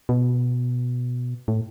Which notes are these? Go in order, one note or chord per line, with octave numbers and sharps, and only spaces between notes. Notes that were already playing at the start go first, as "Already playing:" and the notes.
B2
A2